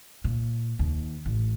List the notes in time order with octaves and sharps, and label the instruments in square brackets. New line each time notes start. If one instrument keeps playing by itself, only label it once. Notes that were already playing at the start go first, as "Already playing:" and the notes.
[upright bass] A#2
D#2
A1